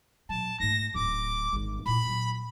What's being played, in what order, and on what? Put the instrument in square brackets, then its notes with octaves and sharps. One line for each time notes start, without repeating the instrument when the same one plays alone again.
[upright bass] B2 F#3 [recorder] A5
[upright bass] G#2 A3 [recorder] A#6
[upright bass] D1 D4 [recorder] D6
[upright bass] G#1 D3
[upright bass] A#2 E4 [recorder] B5
[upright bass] A#2 F#3